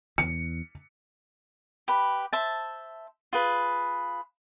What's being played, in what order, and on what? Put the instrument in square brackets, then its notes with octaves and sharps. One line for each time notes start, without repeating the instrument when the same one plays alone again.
[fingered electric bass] E2 [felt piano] C#7
[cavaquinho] G4 B4 B5
C5 E5 A5
F4 G#4 B4